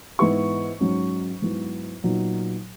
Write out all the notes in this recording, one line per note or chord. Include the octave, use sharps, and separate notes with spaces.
G#2 E3 B3 E4 C#6
G#2 F#3 C#4
G#2 F#3 B3 E4
A#2 F#3 B3 D#4